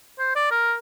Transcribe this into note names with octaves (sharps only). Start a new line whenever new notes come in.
C5
D5
A#4